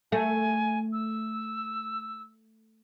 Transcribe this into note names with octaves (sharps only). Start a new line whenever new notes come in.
A3 G#5
E6